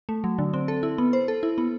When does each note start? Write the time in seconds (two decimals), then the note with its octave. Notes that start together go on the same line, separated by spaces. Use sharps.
0.09 A3
0.24 F#3
0.39 D3
0.54 C4
0.68 A4
0.83 E4
0.98 B3
1.13 C5
1.28 A4
1.43 E4
1.58 B3